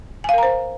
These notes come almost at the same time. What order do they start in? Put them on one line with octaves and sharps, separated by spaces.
G#5 F5 A#4 A#5 C5